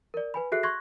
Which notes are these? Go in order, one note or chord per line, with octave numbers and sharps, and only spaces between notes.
A#4 D5
B4 G#5 B5
F#4 G#4 A4 E5 F#6 C7
C6 C#6 F#6 G#6 A#6